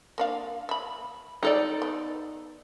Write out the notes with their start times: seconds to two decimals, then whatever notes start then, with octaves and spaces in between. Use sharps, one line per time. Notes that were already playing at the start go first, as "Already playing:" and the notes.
0.18 A#3 D4 F5
0.69 E5 B5
1.43 D#4 A4 D5
1.82 B3